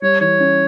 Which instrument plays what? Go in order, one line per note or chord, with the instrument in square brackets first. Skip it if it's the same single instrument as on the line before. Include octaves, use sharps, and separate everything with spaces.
[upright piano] G3 [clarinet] C#5
[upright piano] E3 [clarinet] C#5
[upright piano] C#4